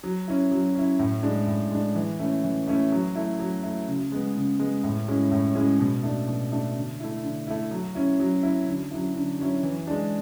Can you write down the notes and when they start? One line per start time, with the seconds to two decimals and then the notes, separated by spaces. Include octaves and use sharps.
0.04 F#3
0.28 C#4 E4
0.52 F#3
0.75 C#4 E4
0.99 A2
1.23 G#3 D4
1.47 A2
1.71 G#3 D4
1.95 E3
2.19 A3 C#4 E4
2.44 E3
2.68 A3 C#4 E4
2.92 F#3
3.15 A3 E4
3.39 F#3
3.63 A3 E4
3.88 C#3
4.12 G#3 B3
4.36 C#3
4.59 G#3 B3
4.84 A2
5.08 G#3 C#4 E4
5.32 A2
5.55 G#3 C#4 E4
5.80 B2
6.03 A3 D4
6.28 B2
6.52 A3 D4
6.76 D3
7.00 A3 E4
7.24 D3
7.47 A3 E4
7.71 F#3
7.95 C#4 E4
8.20 F#3
8.43 C#4 E4
8.67 D3
8.91 F#3 C#4 E4
9.15 D3
9.39 F#3 C#4 E4
9.63 E3
9.87 G#3 D4